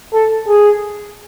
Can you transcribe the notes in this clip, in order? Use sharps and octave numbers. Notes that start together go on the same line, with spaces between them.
A4
G#4